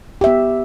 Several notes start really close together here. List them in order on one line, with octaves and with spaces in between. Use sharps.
G4 E5 B3